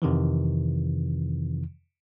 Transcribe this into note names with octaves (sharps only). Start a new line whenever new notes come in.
F2 C3 D#3 E3